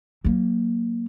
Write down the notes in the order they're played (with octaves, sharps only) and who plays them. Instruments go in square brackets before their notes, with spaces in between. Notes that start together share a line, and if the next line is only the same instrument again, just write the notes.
[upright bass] F#3 A#3